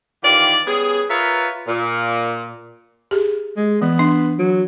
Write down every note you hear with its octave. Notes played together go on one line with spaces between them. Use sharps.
D#3 E3 F4 G4 D5
G3 B3 C#4 G#4
F4 A#4 B4 C#5 E5
A#2
G4 G#4
G#3
E3 B3
D4
F#3